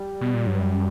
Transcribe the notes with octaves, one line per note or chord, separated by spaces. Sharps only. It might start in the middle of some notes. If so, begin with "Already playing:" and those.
Already playing: G3
B2
A#2
G2 F#3
F#2 G3